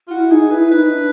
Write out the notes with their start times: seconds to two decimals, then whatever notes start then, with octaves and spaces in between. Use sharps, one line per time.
0.07 F4
0.11 E4 F#4
0.31 D#4 G#4
0.51 E4 B4
0.71 D#4 B4
0.92 D4